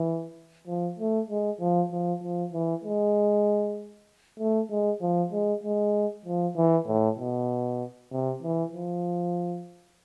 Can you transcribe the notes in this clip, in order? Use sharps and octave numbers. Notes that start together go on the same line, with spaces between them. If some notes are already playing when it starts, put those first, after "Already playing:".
Already playing: E3
F3
A3
G#3
F3
F3
F3
E3
G#3
A3
G#3
F3
G#3
G#3
F3
E3
A2
B2
C3
E3
F3